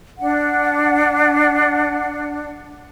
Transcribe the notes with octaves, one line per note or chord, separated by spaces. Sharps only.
D4 F#5